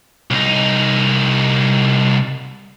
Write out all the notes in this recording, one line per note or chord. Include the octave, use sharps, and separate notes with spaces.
C2 D#4